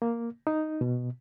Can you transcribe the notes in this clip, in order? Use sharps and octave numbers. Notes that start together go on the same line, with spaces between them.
A#3
D#4
B2